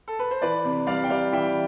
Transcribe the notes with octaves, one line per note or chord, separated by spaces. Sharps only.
A4
B4
C5
E3 B4 D5
C3
G3 D5 F5
G5
G3 D5 F5
E3 E5 G5